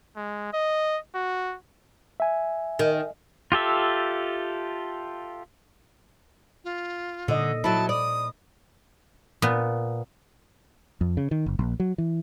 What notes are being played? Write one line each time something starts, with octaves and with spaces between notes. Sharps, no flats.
G#3
D#5
F#4
E5 G#5
D#3
F4 G4 A4 E5
F4
A#2 D3 D#5
F#3 E4 A5
D5 D#6
A#2 B3
F2
C#3
D#3
F#1
A#1
F#3
E3